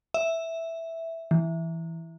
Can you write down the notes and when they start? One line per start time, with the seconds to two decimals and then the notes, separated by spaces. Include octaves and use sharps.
0.14 E5
1.31 E3